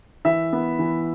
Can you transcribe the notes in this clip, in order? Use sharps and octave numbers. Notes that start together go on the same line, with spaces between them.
E3 E5
B3
E3